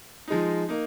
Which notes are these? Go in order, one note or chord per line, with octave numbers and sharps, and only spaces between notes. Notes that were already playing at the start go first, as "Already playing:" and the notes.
F3 G#3 D#4
A#3 D#4